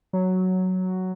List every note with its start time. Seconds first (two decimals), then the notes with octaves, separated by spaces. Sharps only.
0.13 F#3